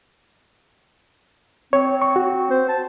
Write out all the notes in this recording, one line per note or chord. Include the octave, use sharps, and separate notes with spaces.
C4 C#5
C#6
F#4
C5
A5